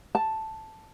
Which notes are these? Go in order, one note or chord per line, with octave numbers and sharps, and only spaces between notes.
A5